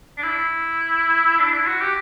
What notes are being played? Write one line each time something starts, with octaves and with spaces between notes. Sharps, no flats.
D4
E4
D4
E4
F#4
G4